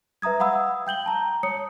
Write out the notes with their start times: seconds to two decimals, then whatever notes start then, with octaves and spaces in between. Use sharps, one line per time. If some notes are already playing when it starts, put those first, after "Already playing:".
0.22 B4 E5 A#5 D#6 G#6
0.40 F5 F#5 B5 D#6 E6
0.87 G5 G6 F#7 G7
1.06 A5 A#5
1.43 C#5 D#6 C#7